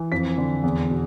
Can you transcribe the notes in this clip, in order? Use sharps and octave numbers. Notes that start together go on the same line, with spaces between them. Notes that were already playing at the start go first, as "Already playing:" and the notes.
Already playing: E3
F2 B6
D3
E2
B2